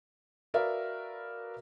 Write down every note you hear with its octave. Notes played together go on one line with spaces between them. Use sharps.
F#4 A#4 B4 D5 E5 F5